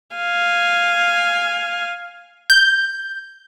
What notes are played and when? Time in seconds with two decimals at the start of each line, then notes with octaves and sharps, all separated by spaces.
0.16 F5 G#5
2.50 G6